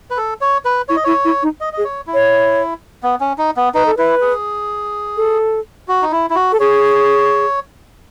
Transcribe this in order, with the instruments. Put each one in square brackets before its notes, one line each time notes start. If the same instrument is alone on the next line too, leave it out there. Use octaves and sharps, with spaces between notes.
[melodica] B4
A4
C#5
B4
[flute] E4 [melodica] C#5
[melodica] D#5
[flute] E4 [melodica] C#5
[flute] E4
D#4
[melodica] D#5
[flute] G#4 [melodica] D#5
[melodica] C#5
E4
[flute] C#5
[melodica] B3
C#4
D#4
B3
[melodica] D#4 [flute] B4
[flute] A4
[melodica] E4 [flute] B4
[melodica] G#4
[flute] A4
[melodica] F#4
D#4
E4
E4
F#4
[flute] A4
[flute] G#4 [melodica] C#5